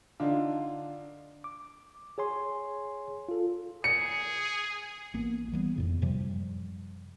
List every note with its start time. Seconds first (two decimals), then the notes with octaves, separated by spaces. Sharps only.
0.20 D3 D4 D#4 F4
1.44 D6
2.18 G#4 C#5 G#5 C6
3.29 F4 A4
3.84 G#4 C#7
5.14 A1 A#3 B3
5.52 E3 G3 G#3 B3
5.76 F2 A2 C#3
6.02 F#2 C3 F3 G3